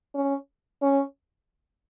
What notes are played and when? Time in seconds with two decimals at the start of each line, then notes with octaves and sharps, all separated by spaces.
0.14 C#4
0.82 C#4